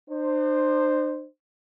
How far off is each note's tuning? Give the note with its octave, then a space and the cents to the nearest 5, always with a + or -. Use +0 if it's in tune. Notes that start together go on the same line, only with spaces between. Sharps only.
D4 +45 C5 +0